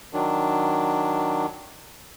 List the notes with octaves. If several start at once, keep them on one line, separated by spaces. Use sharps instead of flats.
D#3 F#3 D4